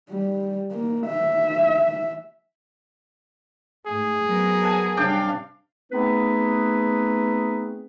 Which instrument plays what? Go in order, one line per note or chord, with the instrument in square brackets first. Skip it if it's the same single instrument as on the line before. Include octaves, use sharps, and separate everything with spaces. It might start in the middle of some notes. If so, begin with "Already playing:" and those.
[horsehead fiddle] G3
A#3
E5
[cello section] G#2 A3 [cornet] G#4
[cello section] F#3 B3 A#4
[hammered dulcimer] F#5 G#5 A5
[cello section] C3 G3 F5 [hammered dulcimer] C#4 D4 G5
[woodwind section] A3 B3 C4 D#4 G#4 B4